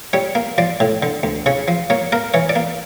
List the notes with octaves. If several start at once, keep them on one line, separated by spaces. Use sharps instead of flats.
G3 C#5
A#3
F3 D5
A2
D3
D2
C#3 C#5
F3
A#3 C#5
A#3 A#4
E3 C#5
D5
A#3